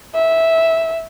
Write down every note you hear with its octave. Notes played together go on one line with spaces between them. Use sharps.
E5